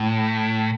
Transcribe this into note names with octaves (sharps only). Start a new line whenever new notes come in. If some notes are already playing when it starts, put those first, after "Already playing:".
Already playing: A2